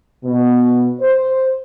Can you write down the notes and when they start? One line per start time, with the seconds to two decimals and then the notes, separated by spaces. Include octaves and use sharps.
0.24 B2
1.01 C5